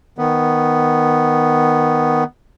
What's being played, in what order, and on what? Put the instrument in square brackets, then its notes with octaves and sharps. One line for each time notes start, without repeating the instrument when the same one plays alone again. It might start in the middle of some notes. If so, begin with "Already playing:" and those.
[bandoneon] D#3 B3